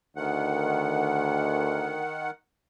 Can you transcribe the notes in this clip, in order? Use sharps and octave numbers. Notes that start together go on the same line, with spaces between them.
D2 D#3 F#5